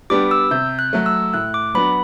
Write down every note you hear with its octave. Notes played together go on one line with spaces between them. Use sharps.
G3 B3 D4 G4 D6
E6
C3 G6
F#6
F#3 A3
E6
A2 F#6
D6
F#3 B3 D4 F#4 B5